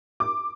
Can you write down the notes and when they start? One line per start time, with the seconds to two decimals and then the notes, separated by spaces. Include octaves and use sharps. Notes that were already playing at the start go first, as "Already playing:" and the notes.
0.20 D6